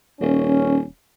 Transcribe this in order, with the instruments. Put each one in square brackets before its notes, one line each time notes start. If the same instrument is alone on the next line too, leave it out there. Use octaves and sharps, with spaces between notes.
[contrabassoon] D#1 [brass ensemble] C#4